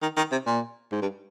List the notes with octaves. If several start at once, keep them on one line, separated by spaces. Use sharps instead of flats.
D#3
D#3
C3
A#2
G#2
G2